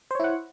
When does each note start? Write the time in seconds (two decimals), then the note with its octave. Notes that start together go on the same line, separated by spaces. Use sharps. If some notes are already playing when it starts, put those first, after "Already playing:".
0.11 C5
0.15 C#5
0.20 E4
0.24 F#5